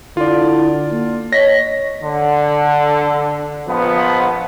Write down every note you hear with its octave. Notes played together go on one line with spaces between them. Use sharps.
D3 E4 F4 D5
A#3
C#5 D#5 A#6 B6
D3
A#1 F3 B3